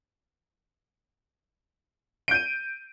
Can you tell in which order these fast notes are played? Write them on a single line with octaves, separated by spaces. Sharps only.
D7 G6 D#7